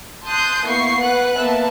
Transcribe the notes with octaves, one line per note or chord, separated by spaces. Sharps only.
A5 C6 D#6 F#6 G6
A#3 B3 E4 C#6 C7
B4 F#5 F#6
A#3 B3 E5 A5